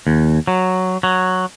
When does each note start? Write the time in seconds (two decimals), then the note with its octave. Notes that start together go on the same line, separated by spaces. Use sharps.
0.07 D#2
0.47 F#3
1.03 F#3